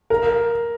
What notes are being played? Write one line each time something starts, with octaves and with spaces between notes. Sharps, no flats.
A#4